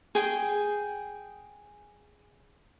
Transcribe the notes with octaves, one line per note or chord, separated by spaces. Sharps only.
G#4 G5